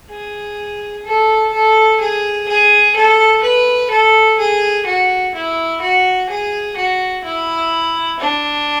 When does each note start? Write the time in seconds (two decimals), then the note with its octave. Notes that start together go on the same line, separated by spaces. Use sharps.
0.11 G#4
1.05 A4
1.53 A4
2.01 G#4
2.48 G#4
2.96 A4
3.43 B4
3.91 A4
4.39 G#4
4.86 F#4
5.35 E4
5.81 F#4
6.30 G#4
6.77 F#4
7.25 E4
8.20 D4